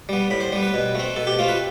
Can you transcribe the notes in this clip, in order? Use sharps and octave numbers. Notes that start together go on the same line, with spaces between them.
G3 B3
A2 B5
C5
G3 B3
B4
B2
A3 C4
B2 A4
G4
A3 C4 F4
B4